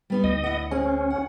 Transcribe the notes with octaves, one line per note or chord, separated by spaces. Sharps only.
G3 B3 D#4
D2 D#5
E4 F#5
C4 C#4 G#4
F#5